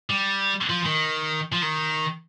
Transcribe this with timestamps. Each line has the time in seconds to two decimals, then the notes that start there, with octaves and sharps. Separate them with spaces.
0.10 G3
0.69 F3
0.85 D#3
1.52 F3
1.62 D#3